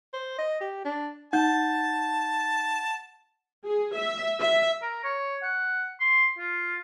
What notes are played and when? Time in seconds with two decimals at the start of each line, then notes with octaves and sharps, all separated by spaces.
0.13 C5
0.38 D#5
0.60 G4
0.85 D4
1.33 D#4 F#5 A5 G6
3.66 G#4
3.96 E5
4.41 E5
4.82 A#4
5.04 C#5
5.42 F#5
6.00 C6
6.38 F4